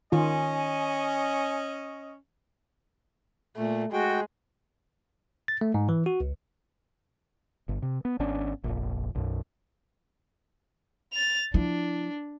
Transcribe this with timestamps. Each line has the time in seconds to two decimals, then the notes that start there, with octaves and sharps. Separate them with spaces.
0.12 D#3 C#4 F4 D#5 G#5
3.57 A#2 A3
3.93 G#3 F#4 G5
5.48 A6
5.61 A3
5.74 G#2
5.89 E3
6.06 F#4
6.20 C#2
7.69 G1
7.82 C3
8.05 B3
8.19 G#1 B3 C#4 D4
8.64 F1 A#1
9.15 B1 F#2
11.13 A6 F7
11.54 F3 D4 E4